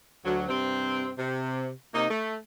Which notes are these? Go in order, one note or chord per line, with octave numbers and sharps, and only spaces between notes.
D2 F#3
G2 C3 C4
C3
C3 A#3 D#4
A3